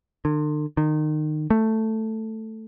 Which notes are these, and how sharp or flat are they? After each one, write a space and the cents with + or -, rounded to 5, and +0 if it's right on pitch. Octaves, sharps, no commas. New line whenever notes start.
D3 +45
D#3 -25
A3 +5